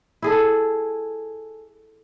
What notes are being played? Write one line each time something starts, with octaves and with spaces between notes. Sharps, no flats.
E4 G#4 A4